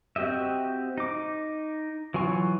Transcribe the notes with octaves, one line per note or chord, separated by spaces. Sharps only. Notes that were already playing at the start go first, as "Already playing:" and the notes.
C4 F#4 G4 D#5 E5
D#4 D6
E3 F#3 F4 G#5 C#6